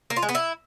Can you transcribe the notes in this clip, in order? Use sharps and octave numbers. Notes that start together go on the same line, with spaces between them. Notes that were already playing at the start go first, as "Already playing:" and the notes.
A#3
F4
G#3
B3
E4